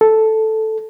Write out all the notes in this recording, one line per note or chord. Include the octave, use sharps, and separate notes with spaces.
A4